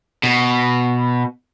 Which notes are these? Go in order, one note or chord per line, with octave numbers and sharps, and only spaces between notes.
B2